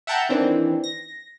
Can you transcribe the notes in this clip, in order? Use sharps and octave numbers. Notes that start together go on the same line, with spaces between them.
E5 F#5 G5 A5 A#5 G6
D#3 E3 C4 D4
A#6